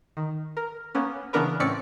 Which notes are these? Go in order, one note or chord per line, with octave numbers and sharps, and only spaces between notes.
D#3
A#4
A#3 B3 C#4
C#3 E3 B3 D4 A#4 B4
A2 C4 C#4 D5 B6 C#7